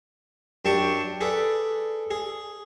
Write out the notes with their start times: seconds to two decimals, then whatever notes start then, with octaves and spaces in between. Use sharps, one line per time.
0.65 F#2 D4 G4 A5 C#6
1.21 G#4 A4 B4 D5
2.11 G#4